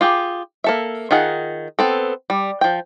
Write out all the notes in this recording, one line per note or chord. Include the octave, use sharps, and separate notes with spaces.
F4 G4 G#4
A#3 A4 E5
D#3 F4 G#4 F#5
B3 C4 A4
G3
F3 G5